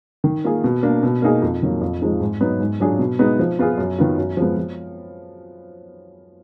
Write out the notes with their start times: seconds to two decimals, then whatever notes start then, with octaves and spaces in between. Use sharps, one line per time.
0.24 D#3
0.44 A#3 F4 G#4
0.64 B2
0.83 A#3 D4
1.03 B2
1.22 A#3 D#4 G#4
1.42 F2
1.62 D#3 F#3 A#3
1.81 F2
2.02 F3 G#3 D#4
2.20 G#2
2.41 F#3 B3 D#4
2.60 G#2
2.80 F#3 D4 F4 G#4
2.99 B2
3.19 G#3 B3 D#4
3.39 F3
3.59 B3 F4 G#4
3.78 F#2
3.98 D#3 F#3 B3 F4
4.18 F#2
4.37 F3 G#3 B3
4.57 F3